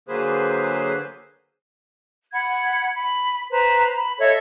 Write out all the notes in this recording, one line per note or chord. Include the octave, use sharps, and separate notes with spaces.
D3 F#3 A#3 G#4 B4 C5
F#5 B5 G#6
B5
B4 C5 A#5
B5
A4 C#5 D#5 E5